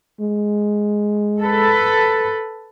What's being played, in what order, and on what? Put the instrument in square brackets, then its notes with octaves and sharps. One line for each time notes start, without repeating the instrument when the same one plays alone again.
[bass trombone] G#3
[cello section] A4 B4